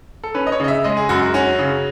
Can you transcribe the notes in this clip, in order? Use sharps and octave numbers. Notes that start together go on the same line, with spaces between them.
A4
C#4 B4
D#5
C#5
C#3 D#5
E5
G#3 D#5
G#4
F#2 F#4
F#4
C#4 F#4
C#3